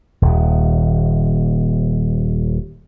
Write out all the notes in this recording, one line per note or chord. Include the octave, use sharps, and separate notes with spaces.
D#1 D#2